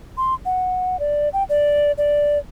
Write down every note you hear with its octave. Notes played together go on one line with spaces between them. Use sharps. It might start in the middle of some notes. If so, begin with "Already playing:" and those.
C6
F#5
D5
G5
D5
D5